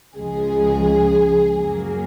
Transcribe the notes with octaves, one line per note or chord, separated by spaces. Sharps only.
C#2 C#3 F3 G#3 G#4
F#2 C#3 F#3 A#3